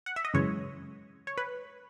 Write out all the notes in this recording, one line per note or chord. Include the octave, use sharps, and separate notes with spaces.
F#5
E5
D#5
F#2 C#3 E3 G#3 C#5
C#5
B4